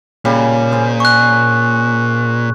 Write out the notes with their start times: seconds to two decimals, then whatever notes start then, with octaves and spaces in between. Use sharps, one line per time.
0.25 A#2 C#3 G3
0.72 G#4 C5 G#5
1.00 C#6 F#6